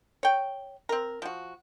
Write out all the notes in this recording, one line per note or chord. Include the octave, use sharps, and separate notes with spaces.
C#5 G5
C4 A#4
F3 F#4